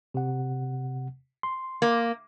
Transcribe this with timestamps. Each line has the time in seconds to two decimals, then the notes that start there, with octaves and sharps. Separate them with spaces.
0.14 C3 F#5
1.43 C6
1.82 A#3